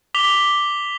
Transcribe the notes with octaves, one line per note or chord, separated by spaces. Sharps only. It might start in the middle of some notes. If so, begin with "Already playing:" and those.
D6 B6 F7 G7